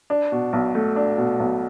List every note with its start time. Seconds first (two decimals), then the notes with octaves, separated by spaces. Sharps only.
0.10 D4
0.32 B2
0.53 B1
0.75 A3
0.96 D4
1.18 B2
1.40 B1